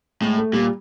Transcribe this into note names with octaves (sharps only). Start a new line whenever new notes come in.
A2 G#3
A3
A#2 G3